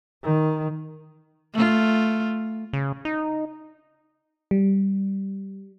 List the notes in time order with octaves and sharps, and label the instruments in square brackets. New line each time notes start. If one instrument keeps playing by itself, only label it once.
[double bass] D#3
[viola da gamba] A3 F4
[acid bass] C#3
D#4
[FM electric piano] G3